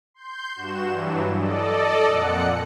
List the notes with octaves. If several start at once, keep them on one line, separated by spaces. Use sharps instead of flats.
C6 G6
G2 F#4 E7
G2 E3 F#3
A4 D5 D#5
F2 A#2 F#5 F#6 C#7